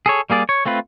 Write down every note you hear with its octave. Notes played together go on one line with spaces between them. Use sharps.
G#4 A4 C#5
G3 A#3 G#4 D5
C#5
A3 C4 F4 B4